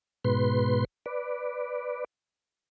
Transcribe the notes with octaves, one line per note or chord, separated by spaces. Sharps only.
G#2 B2 B4 C6
B4 D5